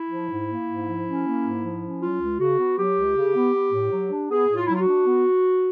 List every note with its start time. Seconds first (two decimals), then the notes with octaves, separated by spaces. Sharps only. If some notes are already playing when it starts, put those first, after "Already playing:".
Already playing: E4
0.10 F3
0.30 G#2
0.49 A#3
0.68 G#2
0.86 F3
1.07 C#4
1.25 A#3
1.45 G#2
1.64 F3
1.82 C#4
2.01 F#3 F4
2.20 C#2
2.39 C#3 F#4
2.58 B3
2.78 F#3 G4
2.96 C#2
3.16 C#3
3.35 B3
3.53 B3
3.73 A2
3.92 F#3
4.11 D4
4.29 B3 G#4
4.48 A2
4.56 F4
4.66 F#3 E4
4.74 F4
4.80 F#4
4.88 D4
5.06 B3